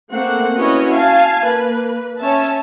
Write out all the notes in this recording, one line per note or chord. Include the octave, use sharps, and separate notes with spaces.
A3 A#3 C4 F#5
C#4 E4 F#4 B4 C#5 D#5
F5 G#5 A5
A#3 B4
C#4 C#5 E5 A5